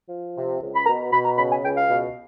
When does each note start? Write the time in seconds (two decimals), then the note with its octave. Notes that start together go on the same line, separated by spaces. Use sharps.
0.09 F3
0.36 C3
0.61 C#2
0.75 B5
0.86 B2 A#5
1.12 B2 B5
1.25 A#5
1.37 C#3 B5
1.51 G#5
1.63 C#2 G5
1.76 F5
1.89 B2